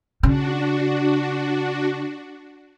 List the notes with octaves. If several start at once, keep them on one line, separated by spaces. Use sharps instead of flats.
C#3 D4 F#4